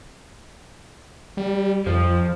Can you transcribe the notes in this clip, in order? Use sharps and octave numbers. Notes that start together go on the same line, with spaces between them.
G3
F2 F3